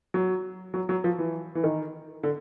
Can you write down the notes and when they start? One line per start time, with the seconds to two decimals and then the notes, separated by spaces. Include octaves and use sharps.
0.14 F#3
0.74 F#3
0.89 F#3
1.04 F3
1.18 E3
1.55 E3
1.64 D#3
2.23 D3